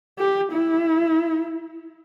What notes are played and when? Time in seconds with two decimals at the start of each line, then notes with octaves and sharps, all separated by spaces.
0.18 G4
0.52 E4